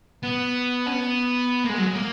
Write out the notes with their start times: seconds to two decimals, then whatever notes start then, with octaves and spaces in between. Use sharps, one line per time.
0.23 B3
0.86 C#4
0.92 B3
1.65 A#3
1.69 G#3
1.78 F#3
1.86 G#3
1.95 A#3